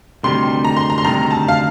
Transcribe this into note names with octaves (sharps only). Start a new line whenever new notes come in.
D2 C3 D#3 G3 C6
A#5
C6
A#5
C6
D2 C3 D#3 G3 A#5
A5
F5